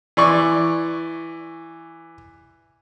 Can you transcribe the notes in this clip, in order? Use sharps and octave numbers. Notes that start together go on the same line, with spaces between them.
E3 D5 C#6